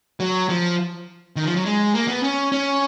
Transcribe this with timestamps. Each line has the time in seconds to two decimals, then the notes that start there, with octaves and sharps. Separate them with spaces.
0.20 F#3
0.49 F3
1.36 D#3
1.45 F3
1.56 F#3
1.65 G#3
1.94 A#3
2.08 B3
2.23 C#4
2.52 C#4